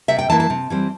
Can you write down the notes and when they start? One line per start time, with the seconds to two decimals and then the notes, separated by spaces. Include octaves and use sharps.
0.08 C3 E5
0.19 G5
0.29 E3 A#3 E4 A5
0.40 A5
0.50 C3
0.70 E3 G3 C4